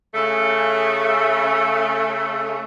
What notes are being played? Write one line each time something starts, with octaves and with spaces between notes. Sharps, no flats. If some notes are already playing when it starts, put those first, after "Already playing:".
C#3 A3